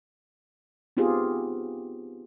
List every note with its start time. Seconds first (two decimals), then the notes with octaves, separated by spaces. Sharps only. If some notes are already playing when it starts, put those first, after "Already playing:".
0.97 B3 C4 D#4 F4 G4 G#4